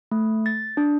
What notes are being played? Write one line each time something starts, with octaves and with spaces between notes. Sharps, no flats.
A3
A6
D4